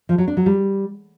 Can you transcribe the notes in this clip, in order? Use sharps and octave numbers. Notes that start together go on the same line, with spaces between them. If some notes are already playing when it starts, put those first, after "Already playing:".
F3
F#3
D4
F#3
G3